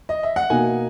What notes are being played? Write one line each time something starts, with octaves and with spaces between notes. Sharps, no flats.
D#5
E5
F#5
B2 A#3 D#4 G#5